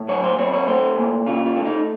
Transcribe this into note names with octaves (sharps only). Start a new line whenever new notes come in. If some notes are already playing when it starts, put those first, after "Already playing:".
Already playing: A2
F#3 C#5
C5
C4 C#5
C#5
A3 C5
A#2
C#3 F4
F4
A3
D#4